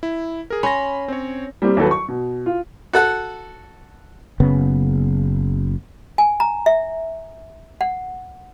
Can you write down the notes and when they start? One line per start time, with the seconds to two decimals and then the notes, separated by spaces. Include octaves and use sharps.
0.03 E4
0.50 G#4 A#4
0.63 C#4 B5 C6 A#6
1.08 C4 C#5
1.62 G3 A#3 C4 G4
1.77 D#2 F#3 A4 B4
1.91 C#6
2.08 B2
2.46 F4
2.93 F#4 A4 F#5
4.40 F#1 C#3 B3
6.18 G#5
6.40 A#5
6.66 E5
7.81 F#5